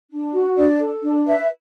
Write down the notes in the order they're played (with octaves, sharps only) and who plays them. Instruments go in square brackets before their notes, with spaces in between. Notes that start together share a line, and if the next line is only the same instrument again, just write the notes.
[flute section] D4
F#4
D4 D5
A4
D4
B4 E5